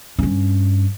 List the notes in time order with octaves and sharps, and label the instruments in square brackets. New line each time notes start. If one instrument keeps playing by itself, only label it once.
[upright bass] G2 C#4